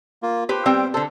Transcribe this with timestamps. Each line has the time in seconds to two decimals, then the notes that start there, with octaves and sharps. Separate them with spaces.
0.23 A#3 F4
0.49 G4 B4 C5
0.66 G3 C4 G5
0.94 D3 A4 C5